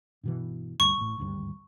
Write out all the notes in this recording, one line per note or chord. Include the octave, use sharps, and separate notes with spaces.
G2 B2 E3
D2 G2 C#6
A1 A2
G#1 D2 G2